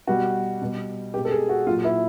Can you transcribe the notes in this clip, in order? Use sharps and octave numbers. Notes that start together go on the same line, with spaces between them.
B2 G3 F#4
B2 G3
B2 G#3 G4
A4
G#4
F#4
A#2 F#3 F4
E4